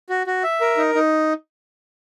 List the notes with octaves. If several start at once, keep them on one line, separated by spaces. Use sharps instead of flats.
F#4
F#4
E5
A#4
D#4
D#4